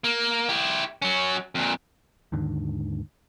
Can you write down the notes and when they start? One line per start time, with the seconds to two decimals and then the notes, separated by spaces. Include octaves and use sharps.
0.04 A#3
0.49 E4 G4
1.02 F#3 C#4
1.55 F2 A#2
2.32 D#2 G#2 D3 D#3